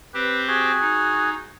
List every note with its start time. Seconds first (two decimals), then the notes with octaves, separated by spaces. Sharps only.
0.14 C4 G4 B4 C5
0.48 F#4 G#4
0.81 D#4